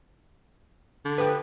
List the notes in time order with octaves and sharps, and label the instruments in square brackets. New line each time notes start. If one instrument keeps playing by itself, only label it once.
[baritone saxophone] D3
[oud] F3 G4 [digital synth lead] B4